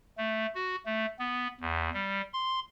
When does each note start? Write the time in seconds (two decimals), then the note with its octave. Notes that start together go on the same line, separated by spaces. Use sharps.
0.18 A3
0.55 F#4
0.86 A3
1.19 B3
1.61 E2
1.94 G3
2.34 C6